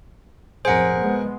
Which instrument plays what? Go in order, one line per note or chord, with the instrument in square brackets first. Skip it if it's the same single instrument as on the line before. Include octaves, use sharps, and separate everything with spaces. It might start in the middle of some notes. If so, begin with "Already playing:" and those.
[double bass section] B1 F2 A2 [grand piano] G#4 A#4 [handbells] C5 F#5
[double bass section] G#3 B3